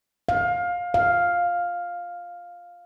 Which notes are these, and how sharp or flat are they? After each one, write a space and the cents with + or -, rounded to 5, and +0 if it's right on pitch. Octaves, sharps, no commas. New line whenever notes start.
F5 +20
F5 +5